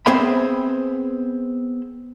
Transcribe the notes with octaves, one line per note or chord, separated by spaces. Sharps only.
B3 C4 G#4 C5 E5 B5